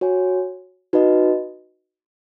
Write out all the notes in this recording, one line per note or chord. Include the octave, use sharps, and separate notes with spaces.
F#4 C#5 G#5
D#4 F#4 B4 D#5